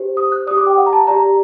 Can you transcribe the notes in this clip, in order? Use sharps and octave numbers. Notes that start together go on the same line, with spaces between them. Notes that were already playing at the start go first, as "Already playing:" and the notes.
Already playing: G4 C5
D#6
F#6
G4 D5 D#6
D6
G5
F#5
A#5
A5
G4 D5 A#5